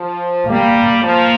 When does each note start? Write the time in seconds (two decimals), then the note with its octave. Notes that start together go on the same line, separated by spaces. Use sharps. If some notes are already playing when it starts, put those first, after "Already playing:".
Already playing: F3
0.47 G3 A#3
1.03 F3 A#3